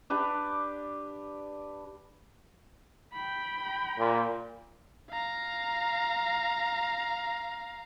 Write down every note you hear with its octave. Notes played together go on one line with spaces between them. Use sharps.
D4 G4 B4 D5
G5 B5
A#2
F5 A#5